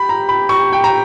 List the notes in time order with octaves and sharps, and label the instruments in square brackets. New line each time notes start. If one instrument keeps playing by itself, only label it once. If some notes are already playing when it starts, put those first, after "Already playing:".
Already playing: [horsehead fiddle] G4 [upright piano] B5
[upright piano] A#5
B5
C#6
G5
A#5